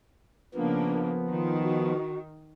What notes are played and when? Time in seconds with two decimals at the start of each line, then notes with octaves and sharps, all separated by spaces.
0.55 C#3 F3 A#3 B3 D4
1.28 D#3 F4
1.62 F#4